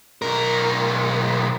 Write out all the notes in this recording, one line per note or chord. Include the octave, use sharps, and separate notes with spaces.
B1 A#4